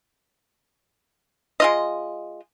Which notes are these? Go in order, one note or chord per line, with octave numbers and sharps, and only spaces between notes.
G#3 F4 D#5